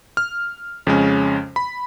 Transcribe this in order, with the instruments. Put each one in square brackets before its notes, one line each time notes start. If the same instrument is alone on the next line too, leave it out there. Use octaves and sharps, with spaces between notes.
[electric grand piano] F6
F2 C#3 G#3 C#4
B5